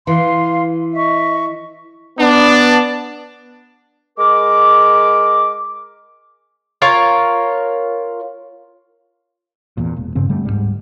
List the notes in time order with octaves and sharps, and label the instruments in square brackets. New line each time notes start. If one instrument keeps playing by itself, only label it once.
[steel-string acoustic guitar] E3 [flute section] F5 C6
[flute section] D#5 E5 C#6
[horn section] B3 D4
[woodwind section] G#3 A#4 D6
[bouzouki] F4 A#4 C#5
[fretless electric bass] E2 A#2
E1
G2 C#3 C4
D3 G3 A3
D1 E2 G#2 G3